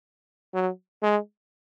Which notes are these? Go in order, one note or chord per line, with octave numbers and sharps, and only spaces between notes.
F#3
G#3